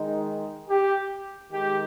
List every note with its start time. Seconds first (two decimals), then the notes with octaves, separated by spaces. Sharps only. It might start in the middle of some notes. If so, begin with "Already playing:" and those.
Already playing: D#3 G#3 D#4
0.70 G4
1.52 D#3 G#3 D#4 G4